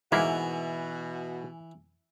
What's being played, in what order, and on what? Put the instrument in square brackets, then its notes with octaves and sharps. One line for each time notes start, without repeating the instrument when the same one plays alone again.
[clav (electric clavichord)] G#2 A#3 E4 [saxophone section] B2 F#4 [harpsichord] E3 [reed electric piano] E5 G#5